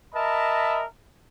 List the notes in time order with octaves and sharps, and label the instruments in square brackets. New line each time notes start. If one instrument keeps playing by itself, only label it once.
[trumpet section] A#4 D#5 E5 A5 B5